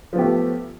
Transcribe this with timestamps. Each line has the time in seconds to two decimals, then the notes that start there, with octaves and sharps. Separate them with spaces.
0.13 F3
0.16 B3
0.18 G4
0.21 A3